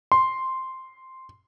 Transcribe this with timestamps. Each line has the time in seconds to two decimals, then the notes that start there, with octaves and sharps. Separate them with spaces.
0.12 C6